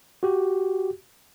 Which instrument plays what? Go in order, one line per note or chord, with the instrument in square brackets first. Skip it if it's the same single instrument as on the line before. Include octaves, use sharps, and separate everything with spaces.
[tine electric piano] F#4 G4